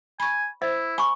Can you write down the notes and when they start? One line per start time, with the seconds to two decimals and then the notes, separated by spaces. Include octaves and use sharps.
0.20 G#5 B5 C#6
0.62 E4 C5 E5
0.98 G#5 B5 C#6